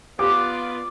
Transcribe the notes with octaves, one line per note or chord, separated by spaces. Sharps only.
B3 F4 G4 B4 D5 D6